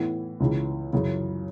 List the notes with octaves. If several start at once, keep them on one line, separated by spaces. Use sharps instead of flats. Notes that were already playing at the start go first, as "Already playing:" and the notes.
Already playing: A2 E3 B3
C#2 C#3 E3
F#2 C#3 E3